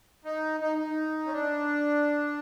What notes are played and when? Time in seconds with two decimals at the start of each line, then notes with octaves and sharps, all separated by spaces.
0.25 D#4
0.60 D#4
0.78 D#4
1.26 C#4
1.31 D4